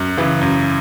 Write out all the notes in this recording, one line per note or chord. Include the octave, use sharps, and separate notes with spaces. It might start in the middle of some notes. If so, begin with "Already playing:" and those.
Already playing: F#2
C#3 E3
F#2